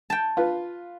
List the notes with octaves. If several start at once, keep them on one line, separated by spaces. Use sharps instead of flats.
G5 A5
F4 B4